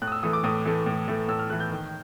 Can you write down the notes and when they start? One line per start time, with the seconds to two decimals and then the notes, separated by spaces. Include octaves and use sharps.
0.02 A2 F#6
0.08 D#6
0.12 E6
0.23 E3 A3 D#6
0.33 D6
0.44 A2 D#6
0.65 E3 A3
0.86 A2
1.08 E3 A3
1.28 A2 E6
1.39 F6
1.50 E3 A3 F#6
1.60 G6
1.70 D#3